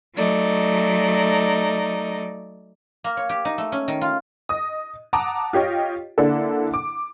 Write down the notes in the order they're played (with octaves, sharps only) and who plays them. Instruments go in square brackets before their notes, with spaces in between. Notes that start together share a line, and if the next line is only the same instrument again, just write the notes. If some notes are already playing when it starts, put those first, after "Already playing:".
[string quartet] F#3 A3 D#4 D5
[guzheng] A#3
C#5
G4
D#4
A3
C#4
D#3
F4
[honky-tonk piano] D#5 D#6
F#5 A5 A#5 D6 D#6
F4 G4 C#5 D#5 G5
D3 A#3 D4 E4 A4
D6